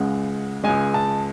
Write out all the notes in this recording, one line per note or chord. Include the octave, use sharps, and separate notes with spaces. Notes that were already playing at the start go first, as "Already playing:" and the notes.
Already playing: C#2 C#3 G#3 F#5
C#2 C#3 G#3 G#5
A5